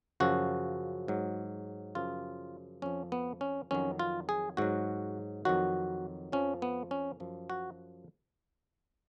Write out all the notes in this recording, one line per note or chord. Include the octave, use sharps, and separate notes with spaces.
F#2 C#3 F3 F#4
G#2 F#3
F#2 C#3 F3 F4
F2 F3 C#4
B3
C#4
F2 D#3 F#3 C#4
F4
G#4
G#2 F#3 F#4
F2 D#3 F#3 F#4
F2 F3 C#4
B3
C#4
F#2 F3
F#4